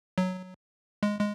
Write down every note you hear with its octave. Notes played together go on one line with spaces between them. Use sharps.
F#3
G#3
G#3